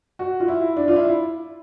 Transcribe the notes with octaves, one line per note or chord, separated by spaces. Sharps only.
F#4
F4
E4
D4
F4
E4